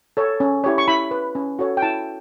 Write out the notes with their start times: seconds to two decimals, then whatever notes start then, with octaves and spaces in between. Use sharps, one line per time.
0.17 A4 C#5
0.40 C#4
0.64 E4 G4 C#5
0.78 C#6
0.88 E4 B5
1.11 B4
1.35 C#4
1.59 F#4 A4 C#5
1.77 G5
1.82 E4 A5